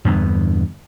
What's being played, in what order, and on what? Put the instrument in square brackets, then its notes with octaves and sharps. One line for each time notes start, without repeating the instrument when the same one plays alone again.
[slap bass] E2 G2 D3 B3